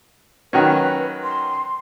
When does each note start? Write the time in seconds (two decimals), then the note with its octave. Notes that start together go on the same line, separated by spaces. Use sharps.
0.53 D#3 F#3 C#4 B4
1.24 C6